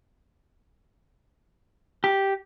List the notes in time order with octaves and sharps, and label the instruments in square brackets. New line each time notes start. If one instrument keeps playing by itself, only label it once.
[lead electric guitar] G4